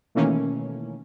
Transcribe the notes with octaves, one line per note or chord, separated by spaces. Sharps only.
B2 D#3 E3 A3 A#3 C#4